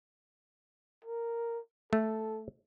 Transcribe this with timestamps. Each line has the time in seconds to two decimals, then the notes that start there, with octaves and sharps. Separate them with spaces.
1.05 A#4
1.93 A3 A4